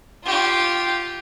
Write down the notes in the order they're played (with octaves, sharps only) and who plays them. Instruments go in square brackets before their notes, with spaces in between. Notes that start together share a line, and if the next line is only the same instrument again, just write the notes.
[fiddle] F4 G4